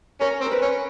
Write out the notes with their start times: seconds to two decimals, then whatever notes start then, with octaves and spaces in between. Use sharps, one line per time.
0.21 C#4 A#4
0.41 C4
0.46 A#4
0.52 B4
0.62 C#4